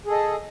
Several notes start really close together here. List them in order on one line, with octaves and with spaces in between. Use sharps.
G#4 A4 D#5